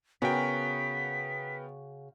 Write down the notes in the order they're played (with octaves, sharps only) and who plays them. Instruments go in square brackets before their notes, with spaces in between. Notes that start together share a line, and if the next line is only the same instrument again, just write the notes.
[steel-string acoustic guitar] C#3 F#4 [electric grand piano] B3 A#4 G5 [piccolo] B6